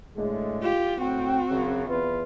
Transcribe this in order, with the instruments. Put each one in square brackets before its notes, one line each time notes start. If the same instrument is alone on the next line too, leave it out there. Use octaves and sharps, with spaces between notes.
[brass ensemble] A2 D3 G#3
[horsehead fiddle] F4 G4
[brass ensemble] A2 G5 [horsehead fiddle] C4 F#4
[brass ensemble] F#2 C#3
E2 F4 B4